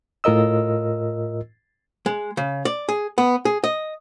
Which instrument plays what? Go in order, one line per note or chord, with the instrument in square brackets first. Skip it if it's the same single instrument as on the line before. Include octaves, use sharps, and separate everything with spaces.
[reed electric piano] A2 F4 A#4 D#5 E6
[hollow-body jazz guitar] G#3
C#3
D5
G#4
B3
G#4
D#5